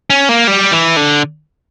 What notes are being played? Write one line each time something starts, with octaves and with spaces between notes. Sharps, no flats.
C#4
A#3
G3
E3
D3